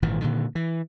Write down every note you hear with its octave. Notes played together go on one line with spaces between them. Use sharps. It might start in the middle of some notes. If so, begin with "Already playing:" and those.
G#1 A#2 E3
A#2 D3 D#3
E3